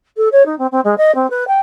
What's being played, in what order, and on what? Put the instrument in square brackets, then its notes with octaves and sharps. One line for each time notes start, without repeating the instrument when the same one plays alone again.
[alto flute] A4
C#5
D#4
C4
C4
G#3
D#5
C4
B4
G5